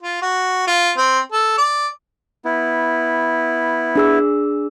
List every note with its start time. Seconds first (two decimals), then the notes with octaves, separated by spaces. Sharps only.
0.03 F4
0.22 F#4
0.67 F4
0.97 C4
1.32 A4
1.57 D5
2.45 B3 E4
3.95 D4 G#4 E6